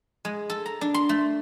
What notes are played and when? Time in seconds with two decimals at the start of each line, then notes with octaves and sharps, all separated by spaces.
0.25 G#3
0.50 A4
0.66 A#5
0.81 D4
0.94 C6
1.09 A3